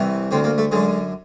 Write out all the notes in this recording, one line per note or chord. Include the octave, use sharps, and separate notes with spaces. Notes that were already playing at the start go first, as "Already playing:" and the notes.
Already playing: C2 C3 E3
D2 D3 C4
A#3
A3
F#2 D3 G#3